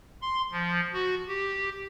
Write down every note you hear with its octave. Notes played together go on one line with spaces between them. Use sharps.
C6
F3
F#4
G4